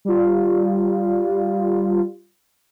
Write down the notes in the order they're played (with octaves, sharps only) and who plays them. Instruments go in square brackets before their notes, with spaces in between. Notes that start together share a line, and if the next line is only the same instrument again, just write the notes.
[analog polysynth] G3 F4